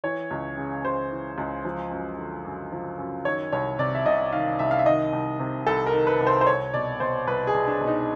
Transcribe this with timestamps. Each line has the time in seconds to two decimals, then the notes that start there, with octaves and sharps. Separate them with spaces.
0.04 E3 C#5
0.31 C#2
0.57 C#3
0.84 C#2 C5
1.11 E3
1.38 C#2
1.65 F3
1.91 F#2
2.18 D3
2.45 F#2
2.72 F3
2.99 F#2
3.25 D#3 C#5
3.53 C2 C#5
3.79 C3 D5
3.95 E5
4.06 C2 D#5
4.32 D#3 F5
4.59 C2 E5
4.71 F5
4.79 E5
4.86 D#3 D#5
5.13 C2
5.40 C3
5.67 C2 A4
5.86 A#4
5.93 D#3
6.07 B4
6.20 C2
6.27 C5
6.41 C5
6.47 C2 C#5
6.74 B2 D5
7.00 B2 C5
7.27 C2 B4
7.47 G#4
7.54 C2
7.67 D4
7.81 B2
7.87 D#4